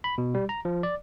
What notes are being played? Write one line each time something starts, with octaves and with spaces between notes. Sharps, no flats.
B5
B2
G3
A#5
F3
D5